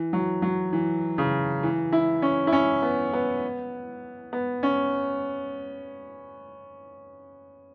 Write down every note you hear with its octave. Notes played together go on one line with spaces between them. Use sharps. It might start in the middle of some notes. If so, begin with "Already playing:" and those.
Already playing: E3
F#3
F#3
E3
C#3
E3
E4
C#4
E4
C#4
B3
B3
B3
C#4